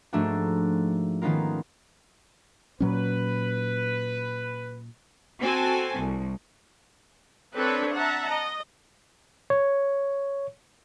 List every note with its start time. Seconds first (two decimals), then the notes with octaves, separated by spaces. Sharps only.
0.13 G#2 F3 A3 A#3 D4 F#4
1.22 D#3 B3 C#4 D#4 F4 A#4
2.80 A#2 F#3 C#4 B4
5.41 C4 F#4 A4 G#5
5.99 C2
7.53 C4 D4 A4 B4 C#5
7.94 E5 F#5 A5 A#5
8.29 D#5
9.50 C#5